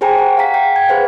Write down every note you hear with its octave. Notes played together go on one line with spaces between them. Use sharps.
G4 G#4 C5 G5 G#5 A#5
F#5
F5 F#5 A#5 B6
G5
G#6
G#4 B4 C5 F5 F#5